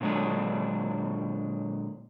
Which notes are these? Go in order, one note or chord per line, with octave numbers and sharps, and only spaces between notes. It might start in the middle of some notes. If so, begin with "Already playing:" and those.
A#2 D3 F#3 G#3 D4